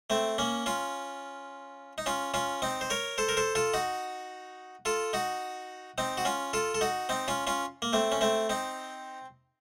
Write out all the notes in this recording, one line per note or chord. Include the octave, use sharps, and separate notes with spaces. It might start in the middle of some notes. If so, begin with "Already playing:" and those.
A3 C4
A#3 C#4
C#4 F4
D#4
C#4 F4
C#4 F4
C4 D#4
C5
A#4 C#5
A4 C5
A#4
A4 C5
F4 A4
D#4 F#4
F4 A4
D#4 F#4
C4 D#4
F#4
C#4 F4
F4 A4
A4
D#4 F#4
C4 D#4
C#4 F4
C#4 F4
A#3
A3 C4
C#4
A3 C4
C4 D#4